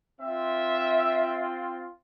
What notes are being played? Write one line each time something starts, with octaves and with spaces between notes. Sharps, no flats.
C4 F4 E5